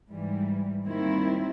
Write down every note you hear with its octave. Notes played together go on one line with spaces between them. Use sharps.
G#2 E3 G3
D#2 D#3 G3 C4 E4